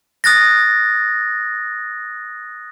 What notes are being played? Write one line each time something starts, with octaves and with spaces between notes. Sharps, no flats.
D#6 F#6 A6 A#6